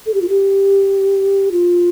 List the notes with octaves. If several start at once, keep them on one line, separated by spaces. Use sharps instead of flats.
A4
G4
F4
G4
F4